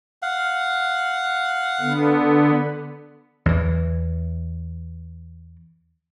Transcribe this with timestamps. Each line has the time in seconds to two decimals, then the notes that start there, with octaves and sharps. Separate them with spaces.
0.22 F5 F#5
1.81 D3 B3
3.46 E2 E3